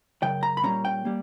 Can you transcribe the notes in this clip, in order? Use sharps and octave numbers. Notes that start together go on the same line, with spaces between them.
F#2 C#3 G5
A#5
B5
A#2 G3 C#4 A#5
G5
G3 A#3